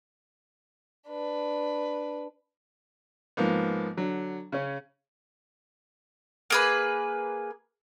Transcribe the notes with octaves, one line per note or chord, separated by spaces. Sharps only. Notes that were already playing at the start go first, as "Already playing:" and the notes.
D4 B4
G#2 F3 A#3 B3
D3 F#3
C#3 C#4
A#3 G#4 B4